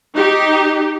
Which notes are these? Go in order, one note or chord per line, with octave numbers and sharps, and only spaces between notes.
D#4 G4